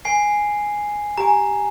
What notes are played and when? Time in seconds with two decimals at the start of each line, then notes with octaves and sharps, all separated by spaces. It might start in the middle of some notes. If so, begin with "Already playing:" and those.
0.05 G#5 C7
1.18 G4 G#5 A#5